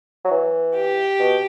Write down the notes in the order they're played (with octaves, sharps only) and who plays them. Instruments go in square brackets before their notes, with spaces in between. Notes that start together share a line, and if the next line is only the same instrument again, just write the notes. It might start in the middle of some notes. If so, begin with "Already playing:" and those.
[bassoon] F#3
E3
[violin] G4
[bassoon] B2